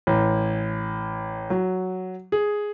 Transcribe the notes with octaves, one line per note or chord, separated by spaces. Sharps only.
A1
F#3
G#4